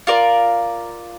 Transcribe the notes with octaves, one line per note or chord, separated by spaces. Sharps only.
F4 A#4 D5